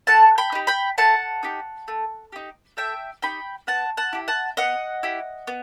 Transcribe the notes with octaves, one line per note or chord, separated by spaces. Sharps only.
A3 F#5 A5
G5 B5
D#4 G4
G5 B5
A3 F#5 A5
D#4 G4
A3
D#4 G4
A3 E5 G5
D#4 G4 G5 B5
B3 F#5 A5
F#5 A5
E4 G4
F#5 A5
B3 D#5 F#5
E4 G4
B3